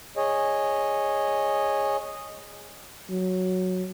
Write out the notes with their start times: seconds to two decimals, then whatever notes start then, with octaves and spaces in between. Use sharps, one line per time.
0.17 G#4 C#5 D#5
3.10 F#3